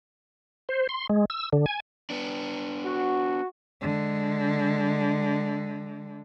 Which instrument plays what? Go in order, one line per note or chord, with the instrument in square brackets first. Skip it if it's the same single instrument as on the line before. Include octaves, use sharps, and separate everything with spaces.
[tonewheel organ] C5
C6
G#3
E6
D3
G#5
[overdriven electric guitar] B3 D4
[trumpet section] F#4
[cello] D3 G#3